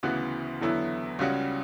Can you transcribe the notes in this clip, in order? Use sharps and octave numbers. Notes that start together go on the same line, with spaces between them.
D2 C#3 E3 B3 F#4
E2 D3 F#3 B3 E4
C#2 C#3 G3 C#4 F#4